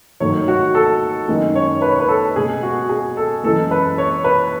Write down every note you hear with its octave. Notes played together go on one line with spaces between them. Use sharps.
G#2 D#3 F#3 A3 C#5
F#4
A4
F#2 D#3 G#3
C#5
B4
C#5
B4
A4
B2 G#3 G#4
F#4
G#4
A4
F#2 E3 G#3 A4
B4
C#5
B4